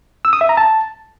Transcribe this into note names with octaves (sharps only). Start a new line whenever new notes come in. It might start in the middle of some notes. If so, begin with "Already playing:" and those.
E6
D#6
E5
A#5
A5